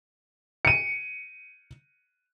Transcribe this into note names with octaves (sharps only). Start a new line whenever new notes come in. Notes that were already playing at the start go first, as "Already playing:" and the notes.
C#7 D#7